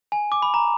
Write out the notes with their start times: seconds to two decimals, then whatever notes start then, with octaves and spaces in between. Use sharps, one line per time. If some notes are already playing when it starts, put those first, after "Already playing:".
0.12 G#5
0.32 D6
0.42 B5
0.54 A#5